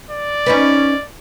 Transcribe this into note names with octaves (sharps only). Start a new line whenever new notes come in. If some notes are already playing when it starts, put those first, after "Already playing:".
D5
C#4 D#4 B4